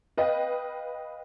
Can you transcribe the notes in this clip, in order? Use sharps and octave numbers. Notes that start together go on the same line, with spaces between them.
B4 D#5 F5 G5